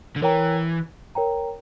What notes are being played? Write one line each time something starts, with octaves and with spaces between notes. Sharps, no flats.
D3
E3 A#4 C#5 G5 A#5
A#4 C#5 G5 A#5